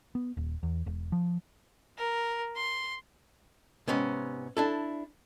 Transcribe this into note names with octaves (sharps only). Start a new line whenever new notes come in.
B3
D#1
E2
E1
F3
A#4
C6
G#2 C3 B3 C#4
D4 E4 A4